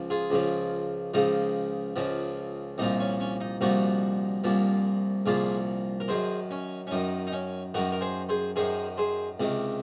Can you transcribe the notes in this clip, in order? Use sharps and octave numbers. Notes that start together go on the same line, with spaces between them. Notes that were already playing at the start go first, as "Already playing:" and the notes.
Already playing: C#2 C#3 F3
F4 G#4
C#2 C#3 F3
C#2 C#3 F3 D#4
C#2 C#3 F3
C2 A#2 F3 D#4
C#4
C#4
D#4
C2 A#2 F3 D#4 F#4
C2 A#2 F3
C2 A#2 F3 F4 G#4
A#4
F#2 D#3 G#4 C5
C#4
C#4
F#2 D#3 D#4
D#4
C#4
F#2 D#3 F#4 A#4
A#4
G#4 C5
G#4 C5
F#2 D#3 G#4 C5
G#4 C5
C#2 C3 D#3